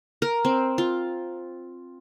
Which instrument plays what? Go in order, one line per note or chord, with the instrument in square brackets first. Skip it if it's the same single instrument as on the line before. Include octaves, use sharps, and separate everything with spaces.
[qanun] A#4
C4
F4